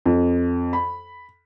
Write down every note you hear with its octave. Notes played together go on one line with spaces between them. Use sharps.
F2
B5